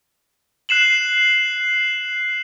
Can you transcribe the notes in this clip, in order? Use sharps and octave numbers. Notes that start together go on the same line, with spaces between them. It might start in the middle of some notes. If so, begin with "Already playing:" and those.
F#6 C7 E7 F#7